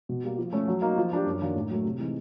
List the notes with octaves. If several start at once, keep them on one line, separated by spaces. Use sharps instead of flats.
B2
G3 A#3
F3
A3 C#4
F#3
A#3 D#4 F#4
F3
A#3 D4 G4
F#2
D#3 F#3 A#3 D4
A2
F#3 A3
C3
E3 G#3 C4 D#4